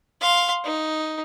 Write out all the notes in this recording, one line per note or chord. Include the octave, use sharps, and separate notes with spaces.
F5 C6
D#4